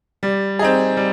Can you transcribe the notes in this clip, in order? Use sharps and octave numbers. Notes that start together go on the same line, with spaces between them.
G3
C4 D#4 G#4
G3